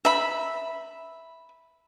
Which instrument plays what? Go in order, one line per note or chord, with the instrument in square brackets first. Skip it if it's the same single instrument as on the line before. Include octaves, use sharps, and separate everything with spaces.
[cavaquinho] E5 B5